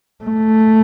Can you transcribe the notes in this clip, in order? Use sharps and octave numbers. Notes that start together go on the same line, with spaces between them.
A3